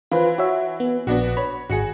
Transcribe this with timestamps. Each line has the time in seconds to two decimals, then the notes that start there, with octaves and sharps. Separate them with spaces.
0.11 E3 F4 B4 C5
0.38 F#4 C#5 E5
0.80 B3
1.07 A#1 B3 D4 F#4
1.37 C#5 B5
1.70 G#1 F#4 G#4 C#7